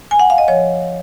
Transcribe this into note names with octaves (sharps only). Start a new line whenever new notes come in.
G#5
F#5
F5
D#5
F3 C#5